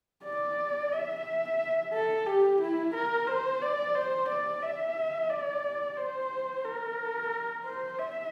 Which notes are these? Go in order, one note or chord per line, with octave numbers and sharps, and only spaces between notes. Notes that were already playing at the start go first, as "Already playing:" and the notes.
D5
E5
A4
G4
E4
A#4
C5
D5
C5
D5
E5
D5
C5
A#4
C5
E5